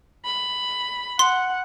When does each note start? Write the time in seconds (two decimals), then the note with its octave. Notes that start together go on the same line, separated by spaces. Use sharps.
0.25 B5
1.19 F#5 C6